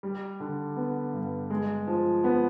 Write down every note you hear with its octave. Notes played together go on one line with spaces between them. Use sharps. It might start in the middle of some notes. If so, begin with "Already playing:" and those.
G3
D3
B3
G2
G#3
F3
B3